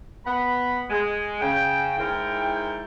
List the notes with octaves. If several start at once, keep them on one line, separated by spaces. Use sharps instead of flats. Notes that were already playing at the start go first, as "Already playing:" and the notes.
B3 F#5 B5
G#3
C#3 G5
G#2 E4 A#4 G5